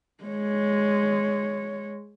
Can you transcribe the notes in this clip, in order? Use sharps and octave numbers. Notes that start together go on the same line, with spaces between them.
G#3 C#5